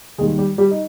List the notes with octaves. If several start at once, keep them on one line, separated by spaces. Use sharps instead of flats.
D#2 D#3 G3 G#3 G#4
G3 G4
G3 G4
D#4